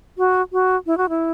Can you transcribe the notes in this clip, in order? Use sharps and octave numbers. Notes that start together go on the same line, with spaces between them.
F#4
F#4
E4
F#4
E4